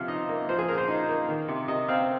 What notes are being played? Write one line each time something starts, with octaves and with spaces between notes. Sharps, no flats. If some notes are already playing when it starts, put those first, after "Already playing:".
Already playing: C3 F3 F5
D#4 D#5
A#3
F3 C5
G#4
A#2 A#4
C5
D#4
A#3
D#3
C3
C3 D#5
C4 F5